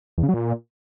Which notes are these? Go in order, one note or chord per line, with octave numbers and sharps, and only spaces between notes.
E2
C#3
F#3
A#2